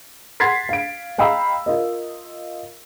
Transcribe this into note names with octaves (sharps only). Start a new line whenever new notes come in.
F#5 C6 G#6 A6 B6 C7
F5 D7
D#5 F5 G5 A#5 B5 E6
F4 A#4 D#5